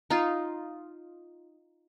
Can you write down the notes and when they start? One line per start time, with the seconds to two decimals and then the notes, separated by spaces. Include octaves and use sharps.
0.10 D#4 F4